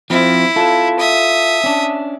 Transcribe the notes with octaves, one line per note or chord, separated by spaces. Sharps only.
F3 C4 E4
F4 A4
E5 D#6
C#4 D4